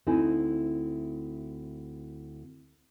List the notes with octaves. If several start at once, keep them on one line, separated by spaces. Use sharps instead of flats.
D2 C4 D#4 E4 G#5